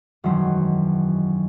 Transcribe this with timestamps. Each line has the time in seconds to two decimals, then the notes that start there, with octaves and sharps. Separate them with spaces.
0.24 E1 F#2 D#3 F#3 C5